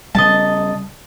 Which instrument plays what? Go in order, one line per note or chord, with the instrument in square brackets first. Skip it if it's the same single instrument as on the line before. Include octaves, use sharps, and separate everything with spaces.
[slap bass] C#3 G3 [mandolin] D#5 A5